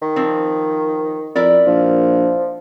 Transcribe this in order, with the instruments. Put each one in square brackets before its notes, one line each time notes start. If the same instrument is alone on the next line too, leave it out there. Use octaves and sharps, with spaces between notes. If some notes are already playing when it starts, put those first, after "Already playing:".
[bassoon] D#3
[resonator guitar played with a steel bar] F3 C4
[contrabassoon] F2 [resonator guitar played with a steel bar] E4 A#4 D5
[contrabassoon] A#1 [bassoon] F3